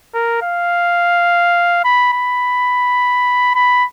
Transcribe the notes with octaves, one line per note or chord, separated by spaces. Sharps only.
A#4
F5
B5
B5
B5